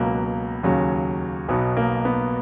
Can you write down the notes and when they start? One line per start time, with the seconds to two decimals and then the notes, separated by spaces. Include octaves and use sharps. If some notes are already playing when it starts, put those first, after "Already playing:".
Already playing: C#2 B2 F#3 A#3
0.63 D#2 C#3 F#3
1.48 B1 B2 F#3 B3
1.77 A#3
2.05 B3